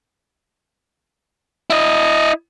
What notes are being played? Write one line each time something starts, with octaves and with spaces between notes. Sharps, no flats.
E4 D#5